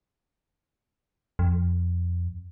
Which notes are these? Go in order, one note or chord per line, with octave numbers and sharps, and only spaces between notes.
F2